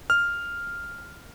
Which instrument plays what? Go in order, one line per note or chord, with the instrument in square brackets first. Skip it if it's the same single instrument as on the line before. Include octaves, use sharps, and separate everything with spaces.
[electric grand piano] F6